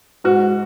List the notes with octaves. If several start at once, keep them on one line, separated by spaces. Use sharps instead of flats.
G#2 F#4